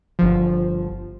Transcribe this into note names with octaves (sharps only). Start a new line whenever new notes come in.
G1 F3